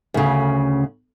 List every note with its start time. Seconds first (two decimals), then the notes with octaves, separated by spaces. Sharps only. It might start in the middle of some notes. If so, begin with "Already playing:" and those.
0.14 D2 C#3